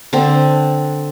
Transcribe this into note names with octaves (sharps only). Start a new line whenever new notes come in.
D3 C4